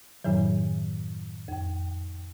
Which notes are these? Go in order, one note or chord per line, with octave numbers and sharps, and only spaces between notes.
F#2 A2 D#3 F#3
F2 G5